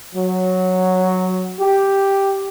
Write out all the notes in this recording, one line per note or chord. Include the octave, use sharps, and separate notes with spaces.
F#3
G4